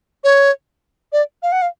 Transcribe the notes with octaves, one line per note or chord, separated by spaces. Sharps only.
C#5
D5
F5
F#5
F5